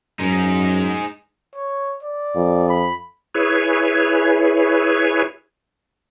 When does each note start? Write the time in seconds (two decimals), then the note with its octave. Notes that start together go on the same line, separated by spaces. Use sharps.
0.19 F#2 G#3 D#4
1.55 C#5
2.03 D5
2.35 F2
2.69 B5
3.35 E4 G#4 B4 C#5